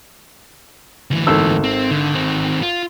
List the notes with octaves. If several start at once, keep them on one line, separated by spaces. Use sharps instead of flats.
D2 E3
G#1 A4 E6
C4
D3
D#3 C4
F4